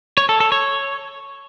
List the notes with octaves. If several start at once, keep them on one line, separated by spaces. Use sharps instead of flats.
C#5
A4
A4
C#5